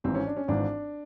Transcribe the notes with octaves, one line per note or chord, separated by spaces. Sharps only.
G#1 G#2 E3 C4
C#4
D4
C#4
G#1 G#2 E3 D4